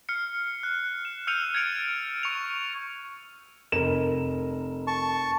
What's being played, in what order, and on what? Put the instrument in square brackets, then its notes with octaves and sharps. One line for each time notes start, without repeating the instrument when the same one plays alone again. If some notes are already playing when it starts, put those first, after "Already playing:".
[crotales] F6 C7 C#7
F#6
E7
E6 F6 G6 C#7 D#7 F7
G#6 A6 C#7 D7 F7
C#6 C#7 F7
[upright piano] F1 A#4 E7
[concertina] A5 C#6